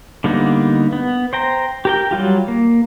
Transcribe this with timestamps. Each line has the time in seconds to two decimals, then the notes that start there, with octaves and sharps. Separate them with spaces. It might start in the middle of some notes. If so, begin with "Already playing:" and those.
0.24 D3 G3 A#3 B3 D#4
0.93 B3
1.33 C5 G5 A#5
1.85 G4 A#4 G5
2.11 F#3 G3 F4 G4
2.48 A#3